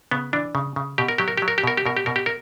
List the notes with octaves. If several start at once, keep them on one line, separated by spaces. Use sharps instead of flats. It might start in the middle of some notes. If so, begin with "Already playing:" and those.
C#3 B3
E3 D4
C#3
C#3
B2 G4
A#4
F#3 G4
A#4
F#3 G4
A#4
G4
B2 A#4
G4
B2 A#4
G4
B2 A#4
G4
A#4